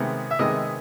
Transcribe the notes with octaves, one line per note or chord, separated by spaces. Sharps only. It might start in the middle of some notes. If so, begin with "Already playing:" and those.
Already playing: C3 D#3 G#3 B3
E5
C3 D#3 G#3 B3 D#5